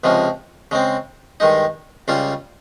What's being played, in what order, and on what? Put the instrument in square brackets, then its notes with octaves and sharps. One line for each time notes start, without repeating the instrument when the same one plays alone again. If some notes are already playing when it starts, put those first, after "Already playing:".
[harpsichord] C#2 C3 F3 G#3 C#4
C#3 G#3 C4
G2 D#3 G#3 D#4
C#2 C#3 G3 C#4 F4